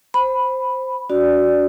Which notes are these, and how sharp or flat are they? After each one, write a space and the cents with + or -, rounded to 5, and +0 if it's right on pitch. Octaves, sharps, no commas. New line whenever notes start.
C5 +0 B5 +0
D4 -45 F#4 +0 D5 +0